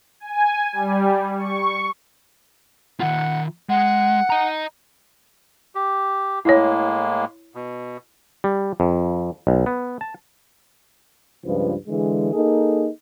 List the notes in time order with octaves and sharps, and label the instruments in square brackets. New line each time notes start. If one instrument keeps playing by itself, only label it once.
[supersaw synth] G#5
G3
C#6
[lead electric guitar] D#3 F4 [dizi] F#5
[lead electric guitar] G#3 [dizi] F#5
[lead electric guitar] D#5 A#5
[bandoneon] G4
[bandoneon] A2 G#3 A#3 [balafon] E4 C#5
[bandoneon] B2
[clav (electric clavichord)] G3
F2
B1
B3
A5
[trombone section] C#2 G2 F3 B4
D3 E3 G#3
A#3 D#4 G#4 A4